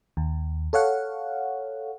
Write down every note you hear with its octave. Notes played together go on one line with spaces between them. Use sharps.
D#2
A4 C#5 F5 F#5